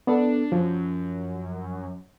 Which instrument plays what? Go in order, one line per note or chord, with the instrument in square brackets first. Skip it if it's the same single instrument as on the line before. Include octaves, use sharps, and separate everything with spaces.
[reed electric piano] B3 A4 [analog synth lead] D4
[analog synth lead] F#2 [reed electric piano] F3